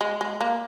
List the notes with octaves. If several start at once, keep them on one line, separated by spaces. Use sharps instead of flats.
G#3
G#3
A#3